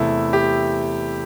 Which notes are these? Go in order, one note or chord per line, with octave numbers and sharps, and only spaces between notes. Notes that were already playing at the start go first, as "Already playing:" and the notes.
Already playing: E2 C3 A3 E4
G4